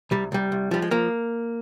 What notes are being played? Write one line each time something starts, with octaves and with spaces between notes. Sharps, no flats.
C2 G3
C2 G3
C2
F3 G3
G#3
F3 A#3